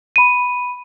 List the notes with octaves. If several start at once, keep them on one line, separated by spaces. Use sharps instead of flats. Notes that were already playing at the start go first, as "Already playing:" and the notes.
B5 D#7